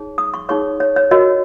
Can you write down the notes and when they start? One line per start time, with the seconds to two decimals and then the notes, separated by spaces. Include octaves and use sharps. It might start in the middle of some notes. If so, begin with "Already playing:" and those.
Already playing: D#4 G#4 C#5
0.18 D#6
0.34 C#6
0.49 D#4 G#4 C#5 C#6
0.80 C#5
0.96 C#5
1.11 F#4 A#4 C#5 D#5